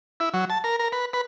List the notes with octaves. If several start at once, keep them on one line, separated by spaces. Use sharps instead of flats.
E4
F#3
A5
A#4
A#4
B4
B4